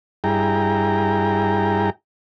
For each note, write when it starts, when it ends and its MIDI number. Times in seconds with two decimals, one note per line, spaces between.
0.24 1.90 43
0.24 1.90 64
0.24 1.90 68
0.24 1.90 79
0.24 1.90 82